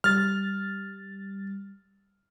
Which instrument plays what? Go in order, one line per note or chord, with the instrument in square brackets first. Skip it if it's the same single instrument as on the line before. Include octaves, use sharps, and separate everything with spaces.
[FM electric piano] G3 A6 [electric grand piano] F6